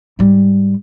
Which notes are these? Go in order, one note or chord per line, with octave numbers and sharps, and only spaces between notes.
G#2 G3